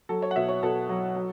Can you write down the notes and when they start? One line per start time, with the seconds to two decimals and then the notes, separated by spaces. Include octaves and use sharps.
0.09 F#3 A4
0.22 C#5
0.31 F#5
0.36 B2 E5
0.49 C#5
0.63 B2 A4
0.89 F#3
1.16 F#3